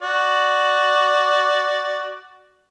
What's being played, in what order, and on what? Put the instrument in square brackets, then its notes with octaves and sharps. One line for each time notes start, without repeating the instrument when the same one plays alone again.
[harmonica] F#4 D5